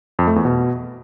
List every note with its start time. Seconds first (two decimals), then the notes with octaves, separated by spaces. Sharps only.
0.19 F2
0.27 A3
0.36 E2
0.45 B2